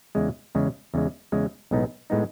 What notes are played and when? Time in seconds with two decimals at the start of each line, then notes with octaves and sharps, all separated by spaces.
0.15 E2 C#3 G#3
0.55 E2 C#3 G#3
0.94 E2 C#3 G#3
1.32 E2 C#3 G#3
1.71 B1 A2 G#3 B3 D#4
2.10 A2 G#3 B3 D#4